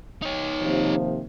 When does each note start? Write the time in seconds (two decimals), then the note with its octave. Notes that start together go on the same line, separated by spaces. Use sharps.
0.22 D#4 C#5
0.62 D#2 C3 F3